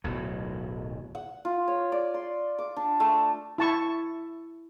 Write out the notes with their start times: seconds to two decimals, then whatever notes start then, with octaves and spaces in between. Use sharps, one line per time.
0.04 D1 B1 F#3
1.15 F#5
1.45 F4
1.68 C#5
1.92 D5
2.14 C6
2.58 D6
2.76 D4
3.00 A3
3.58 E4 A5 C#6